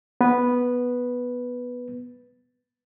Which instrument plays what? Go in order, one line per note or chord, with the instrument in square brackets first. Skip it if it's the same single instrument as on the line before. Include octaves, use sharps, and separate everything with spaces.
[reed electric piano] B3 B4